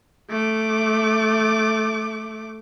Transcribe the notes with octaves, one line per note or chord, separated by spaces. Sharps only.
A3 D6